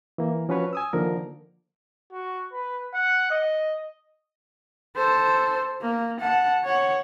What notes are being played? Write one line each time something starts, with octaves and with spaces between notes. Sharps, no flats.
E3 A#3
F3 C#4 F#4 B4 C#5
G#5 D#6 E6
D3 D#3 F3 A#3 A#4
F#4
B4
F#5
D#5
A4 C5
A#3
F#5 A5
C#5 F#5